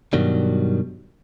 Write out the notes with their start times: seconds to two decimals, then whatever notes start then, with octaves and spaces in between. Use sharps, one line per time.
0.13 G2 B2 D#3 F#3 G3